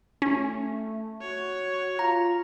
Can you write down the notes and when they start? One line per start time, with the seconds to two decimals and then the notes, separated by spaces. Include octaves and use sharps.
0.22 A3 C#4
1.21 F#4 C#5
1.99 F4 A#5